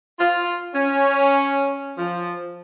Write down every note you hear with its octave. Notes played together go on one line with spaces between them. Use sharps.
F4
C#4
F3